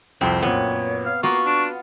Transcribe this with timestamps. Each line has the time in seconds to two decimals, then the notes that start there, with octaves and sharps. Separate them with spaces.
0.21 C2 F2 C4
0.42 F#2 A#2 B3 C#5
1.06 F5
1.23 A#3 B3 F4 F#4 C#6
1.46 D4